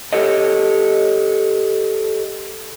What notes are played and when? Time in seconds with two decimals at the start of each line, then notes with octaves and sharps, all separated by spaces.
0.13 G4 A4 C#5 D#5